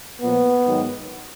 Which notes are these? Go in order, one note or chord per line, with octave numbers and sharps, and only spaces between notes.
A#2 F3 B3
G#2 D#3 F#3